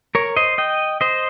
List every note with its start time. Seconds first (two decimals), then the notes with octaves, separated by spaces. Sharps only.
0.15 A#4 C#5
0.37 C5 D#5
0.58 D#5 G5
1.01 C5 D#5